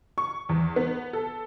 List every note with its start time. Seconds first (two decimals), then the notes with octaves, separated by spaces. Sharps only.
0.18 C#6
0.49 E2
0.76 B3
1.13 A4